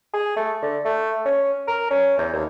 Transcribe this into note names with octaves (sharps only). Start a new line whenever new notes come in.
G#4
A3
D3
A3
C#4
A#4
C#4
E2
D#2